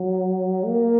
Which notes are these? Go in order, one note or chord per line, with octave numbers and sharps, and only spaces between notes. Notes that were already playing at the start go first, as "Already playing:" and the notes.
Already playing: F#3
A#3